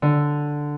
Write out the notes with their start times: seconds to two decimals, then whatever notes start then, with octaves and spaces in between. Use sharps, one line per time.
0.02 D3